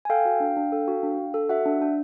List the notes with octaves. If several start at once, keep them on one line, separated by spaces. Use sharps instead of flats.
G#5
A4 F5 G5
F#4
D4
D4
A4
F#4
D4
D4
A4
F#4 E5 F#5
D4
D4